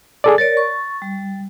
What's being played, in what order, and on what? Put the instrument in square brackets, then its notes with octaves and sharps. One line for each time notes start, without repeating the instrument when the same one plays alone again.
[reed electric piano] G#4 A4 D5
[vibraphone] A#4 C#5 D5 [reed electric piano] A6
[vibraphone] C#6
G3